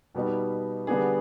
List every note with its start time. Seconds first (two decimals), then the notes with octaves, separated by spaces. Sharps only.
0.15 B2 G3 B3 D#4
0.87 D3 G3 B3 D4 G#4